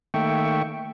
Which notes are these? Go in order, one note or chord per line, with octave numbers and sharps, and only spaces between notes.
D#3 A3 A#3 E5 G5 C#6